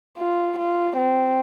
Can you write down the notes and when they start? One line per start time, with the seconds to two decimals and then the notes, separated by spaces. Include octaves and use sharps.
0.18 F4
0.58 F4
0.97 C4